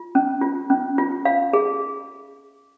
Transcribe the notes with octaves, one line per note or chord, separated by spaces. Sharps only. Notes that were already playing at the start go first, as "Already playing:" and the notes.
Already playing: F4
C#4
F4
C#4
F4
F5
G#4